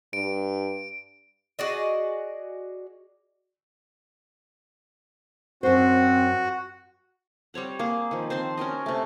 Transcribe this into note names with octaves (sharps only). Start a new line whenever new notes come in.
G2 D7
F#4 G#4 D5 D#5
F#2 C4 F#4 C5
G3 C4 C#5 F#5
A#3 G#4
D#3 F3
C4 C5 A5 C6
C#4 F#4 A#4 D#5
C3 A3